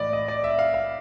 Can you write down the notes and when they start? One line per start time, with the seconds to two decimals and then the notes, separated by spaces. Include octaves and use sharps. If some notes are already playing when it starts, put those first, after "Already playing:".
Already playing: A2 E3 D5 D#5
0.13 D#5
0.28 D5
0.44 E5
0.59 F5
0.74 F5